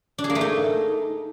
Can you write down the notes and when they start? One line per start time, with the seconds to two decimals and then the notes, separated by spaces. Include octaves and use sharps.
0.18 D4
0.24 G#4
0.30 A#3
0.35 A3
0.41 D#4